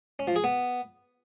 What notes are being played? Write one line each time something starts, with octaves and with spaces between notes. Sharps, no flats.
C#4
F3
G#4
B3